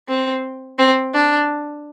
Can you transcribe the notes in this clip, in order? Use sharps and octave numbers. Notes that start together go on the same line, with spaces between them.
C4
C4
D4